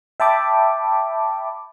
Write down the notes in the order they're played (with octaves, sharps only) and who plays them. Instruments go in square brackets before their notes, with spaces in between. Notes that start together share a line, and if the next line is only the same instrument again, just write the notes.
[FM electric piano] E5 G5 A5 B5 D6